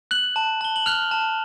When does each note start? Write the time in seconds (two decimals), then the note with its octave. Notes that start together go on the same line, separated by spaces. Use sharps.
0.11 F#6 F#7
0.36 A5
0.61 A5 G7
0.76 F#7
0.86 F6 F#6 F7
1.11 A5